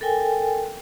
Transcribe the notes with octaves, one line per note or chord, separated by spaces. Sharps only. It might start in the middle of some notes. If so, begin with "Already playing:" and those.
A4 A#4 G5 G#5